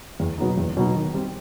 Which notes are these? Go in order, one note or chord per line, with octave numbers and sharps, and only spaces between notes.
E2
B2 F#3 B3 D#4
E2
B2 F#3 B3 D#4
D#3
G3 C4